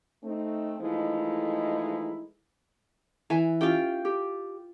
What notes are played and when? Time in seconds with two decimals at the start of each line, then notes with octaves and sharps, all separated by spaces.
0.24 A3 C4 D#4
0.80 E3 F3 G#3 A3 D#4 E4
3.30 E3 G#5
3.61 C#4 F4 G4 E5 G5
4.05 G4